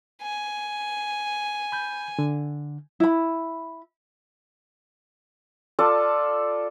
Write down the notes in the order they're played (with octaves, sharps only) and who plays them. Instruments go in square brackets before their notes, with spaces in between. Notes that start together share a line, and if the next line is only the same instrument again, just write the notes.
[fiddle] G#5
[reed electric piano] B5 G6
D3
[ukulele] E4 B5
[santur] F4 A4 D5 A5